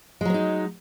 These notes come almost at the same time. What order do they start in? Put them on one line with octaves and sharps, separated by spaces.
G#3 F#3 B3 D#4